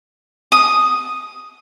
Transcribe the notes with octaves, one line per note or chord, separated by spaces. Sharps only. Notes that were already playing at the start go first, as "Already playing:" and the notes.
D#6